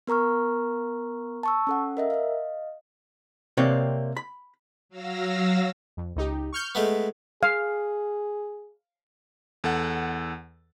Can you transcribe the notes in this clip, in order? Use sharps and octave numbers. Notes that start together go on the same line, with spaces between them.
B3 A#4 A#5 C#6 F6
A5 C#6 E6
C#4 A4 F#5
A#4 D#5 E5
D#5 F5
C3 A#3 C4 C#5 D5
B5
F#3 F5 E6 A#6
F2
C#2 D#4 G4
C#6 F6 G6
G#3 A3 B3
G#4 F5
E2 A4 F#5